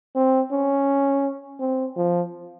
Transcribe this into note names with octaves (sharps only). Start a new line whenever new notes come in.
C4
C#4
C4
F3